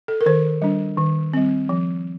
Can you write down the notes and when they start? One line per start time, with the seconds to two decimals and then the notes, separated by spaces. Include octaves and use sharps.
0.08 A4
0.21 A#4
0.26 D#3 C5
0.62 G3 D4
0.97 D#3
1.33 G3 C4
1.69 F3